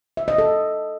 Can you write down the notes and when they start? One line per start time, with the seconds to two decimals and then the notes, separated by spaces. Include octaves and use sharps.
0.17 E5
0.28 D#5
0.38 A4